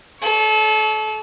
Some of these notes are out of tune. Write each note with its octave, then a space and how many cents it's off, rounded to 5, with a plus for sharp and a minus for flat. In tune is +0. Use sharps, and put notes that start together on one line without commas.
A4 -30 C#5 +40